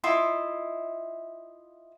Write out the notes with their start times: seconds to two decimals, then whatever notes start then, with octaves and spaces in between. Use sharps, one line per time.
0.04 E4 F4 D#5